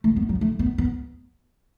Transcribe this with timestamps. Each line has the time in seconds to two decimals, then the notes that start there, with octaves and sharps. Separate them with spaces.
0.04 A3
0.16 B3
0.29 F#3
0.41 A3
0.59 B3
0.78 B3